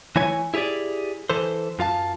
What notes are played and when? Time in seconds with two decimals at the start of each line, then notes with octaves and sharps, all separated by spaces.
0.16 E3 A3 E4 C#5 G#5
0.54 E4 G4 G#4 C#5 D5
1.30 E3 A4 C5
1.79 F#2 F4 F5 A5